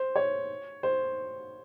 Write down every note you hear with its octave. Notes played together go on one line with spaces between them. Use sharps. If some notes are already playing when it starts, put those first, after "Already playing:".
Already playing: C5
C#5
C5